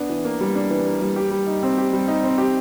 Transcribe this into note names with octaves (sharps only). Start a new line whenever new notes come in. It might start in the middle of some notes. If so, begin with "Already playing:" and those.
Already playing: B3 D4
E3
A#3
G3
D4
E3
A#3
G3
G4
G3
D#4
C4
G4
G3
D#4
C4
G4